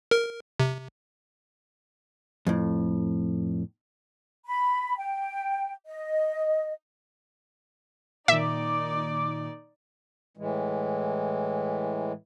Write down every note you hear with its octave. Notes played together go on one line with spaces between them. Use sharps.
A#4
C3
F2 A2
B5
G5
D#5
A#2 D#3 D#4 D5 E5 D6
A2 E3 G#3